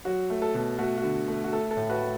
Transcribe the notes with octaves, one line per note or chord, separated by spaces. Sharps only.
F#3 F#4
A3
A4
B2
A3 F#4
F#4
D3
A3
F#4
A3 A4
A4
A2
F#4 B4
A3